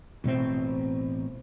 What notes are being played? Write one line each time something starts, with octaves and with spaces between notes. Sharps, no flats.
A1 B2 A3 C4